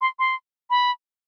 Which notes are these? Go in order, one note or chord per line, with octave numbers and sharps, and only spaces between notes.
C6
C6
B5